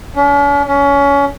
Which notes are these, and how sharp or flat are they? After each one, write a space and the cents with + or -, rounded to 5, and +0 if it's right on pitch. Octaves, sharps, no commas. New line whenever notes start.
C#4 +45
C#4 +25